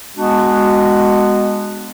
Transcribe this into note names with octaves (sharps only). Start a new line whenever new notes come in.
G#3 B3 D4 F#4